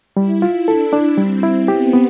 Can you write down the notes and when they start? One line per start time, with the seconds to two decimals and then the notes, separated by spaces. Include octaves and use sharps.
0.17 G3 E4
0.42 F4
0.67 D4 A4
0.93 D4
1.18 G3 C4
1.43 E4
1.68 B3 G4
1.93 B3